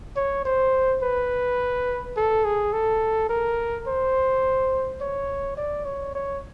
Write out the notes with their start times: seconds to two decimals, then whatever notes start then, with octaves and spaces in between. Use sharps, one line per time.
0.16 C#5
0.45 C5
1.02 B4
2.16 A4
2.45 G#4
2.73 A4
3.29 A#4
3.87 C5
5.01 C#5
5.57 D5
5.85 C#5
6.15 C#5